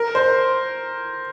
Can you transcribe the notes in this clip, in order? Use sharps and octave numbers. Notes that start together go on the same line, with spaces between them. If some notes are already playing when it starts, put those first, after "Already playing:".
Already playing: A#4
C5